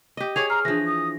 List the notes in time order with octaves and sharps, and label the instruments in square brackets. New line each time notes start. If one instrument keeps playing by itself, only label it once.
[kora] G4 D#5
[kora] G#4 C#5 D5 [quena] G#6 [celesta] F7
[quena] A#5 [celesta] F6 C7
[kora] E3 F3 [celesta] D4 A#6 [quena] G#4
[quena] D#6